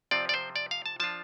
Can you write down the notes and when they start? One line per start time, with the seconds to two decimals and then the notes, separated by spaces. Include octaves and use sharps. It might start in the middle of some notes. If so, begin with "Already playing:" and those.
0.11 C3 F3 C4 F4 D5
0.29 D5
0.34 C5
0.56 D5
0.71 F5
0.86 A5
1.00 F3 D4 F4 A5